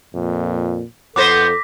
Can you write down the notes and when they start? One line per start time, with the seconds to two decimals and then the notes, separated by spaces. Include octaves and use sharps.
0.14 F2 A#2
1.16 F2 B3 A4 B4 C5 D6 A#6 B6